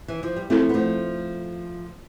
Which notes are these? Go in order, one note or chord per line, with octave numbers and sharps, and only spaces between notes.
E3
F3
G3
F3 A3 C4 E4 A4
B3
F3 A3